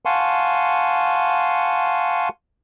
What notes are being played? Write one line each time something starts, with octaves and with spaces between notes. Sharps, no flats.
F5 F#5 G#5 A5 C6 C#6